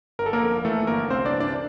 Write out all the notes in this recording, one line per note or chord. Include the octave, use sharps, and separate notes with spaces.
G1 A#4
A4
A#3 A#4
F2
E3 A3 A4
G1 A#3 A#4
C2 C4 C5
D4 D5
E3
D4 D5